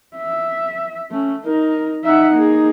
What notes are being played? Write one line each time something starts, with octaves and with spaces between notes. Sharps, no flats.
E5
A3 C#4
D#4 A#4
D#4 E5 F#5
A#3 G#4